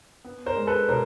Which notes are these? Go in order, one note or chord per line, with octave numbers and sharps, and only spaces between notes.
B3
A#4 C5
G#3
A4 B4
B2 A#4 C5